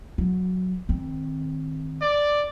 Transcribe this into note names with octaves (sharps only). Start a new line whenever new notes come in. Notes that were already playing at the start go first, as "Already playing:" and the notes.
F#3
D#3 C4
D5